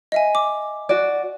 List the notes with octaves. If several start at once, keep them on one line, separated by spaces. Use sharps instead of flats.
D#5 E5 G#5
D6
F#4 D5